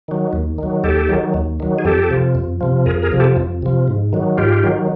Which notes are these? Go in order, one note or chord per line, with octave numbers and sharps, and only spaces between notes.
D#3 F#3
D#2
D#3 F#3
D#2 G4 A4
D#3 F#3
D#2
D#3 F#3
G#4
F2 G4 A4
C3 F3
F2
C3 F3
F2 G#4 A#4
G#4 A#4
C3 F3
G4 A4
F2
C3 F3
G#2
D#3 F#3
G#2 F4 G4
D#3 F#3